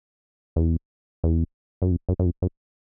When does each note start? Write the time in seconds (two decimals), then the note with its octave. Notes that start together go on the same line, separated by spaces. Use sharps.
0.56 E2
1.24 E2
1.82 F#2
1.91 F2
2.09 F#2
2.19 F#2
2.25 F2
2.42 F#2